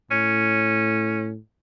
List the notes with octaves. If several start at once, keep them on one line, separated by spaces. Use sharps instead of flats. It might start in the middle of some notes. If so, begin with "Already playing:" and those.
A2 C#4